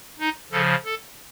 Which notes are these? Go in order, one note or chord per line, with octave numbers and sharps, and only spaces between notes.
D#4
C#3 F3 A4
A4